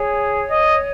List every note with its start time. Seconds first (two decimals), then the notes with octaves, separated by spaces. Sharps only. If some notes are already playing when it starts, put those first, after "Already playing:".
Already playing: G#4 C#5
0.50 D#5